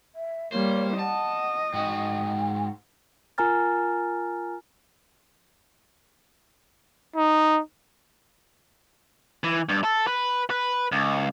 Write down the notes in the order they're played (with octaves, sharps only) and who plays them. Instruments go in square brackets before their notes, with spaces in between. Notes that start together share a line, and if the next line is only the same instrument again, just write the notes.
[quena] E5
[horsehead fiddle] G3 A#3 [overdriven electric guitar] C5 [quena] C#5
[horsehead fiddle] D#5 [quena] F#5 [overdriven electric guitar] A5
[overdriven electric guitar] G#2 F#4 [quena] G5
[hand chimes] F4 A#4 G#5 A#5 F6 A6
[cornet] D#4
[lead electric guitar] E3
G2
A4
B4
B4
C#2